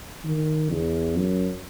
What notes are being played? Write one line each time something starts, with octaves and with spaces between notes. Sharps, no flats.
D#3
E2
F#2